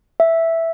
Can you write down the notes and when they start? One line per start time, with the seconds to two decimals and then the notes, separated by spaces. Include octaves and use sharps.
0.20 E5